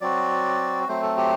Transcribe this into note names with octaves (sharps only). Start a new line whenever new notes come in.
F#3 C4 F#4 D5
F#3 A3 C4 C5
A4
G4